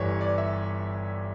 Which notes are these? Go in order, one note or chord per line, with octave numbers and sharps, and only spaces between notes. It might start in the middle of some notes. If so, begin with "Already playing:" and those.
Already playing: G1 G2 E3 G3 C#5
D5
E5